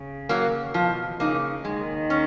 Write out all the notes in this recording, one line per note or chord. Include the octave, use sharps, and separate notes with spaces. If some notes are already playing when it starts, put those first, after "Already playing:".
Already playing: C#3
F#3 A#3
B2 F3
C#3 A#3 D#4
D#2 D#3 G#3
C#4